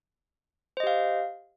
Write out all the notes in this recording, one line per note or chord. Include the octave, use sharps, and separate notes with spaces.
G4 C5 D#5 F5